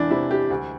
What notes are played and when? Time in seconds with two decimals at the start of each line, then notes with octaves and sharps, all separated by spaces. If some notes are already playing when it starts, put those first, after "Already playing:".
Already playing: E2 E3 D4 E4
0.11 C3 E3 E4
0.31 G4
0.50 D2